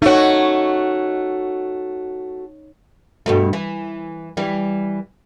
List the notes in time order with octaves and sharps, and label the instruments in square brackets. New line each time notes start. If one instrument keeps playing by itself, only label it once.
[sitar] A3 F#4 [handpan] D#4 C#5
[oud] G2 B2 A3
E3
E3 G3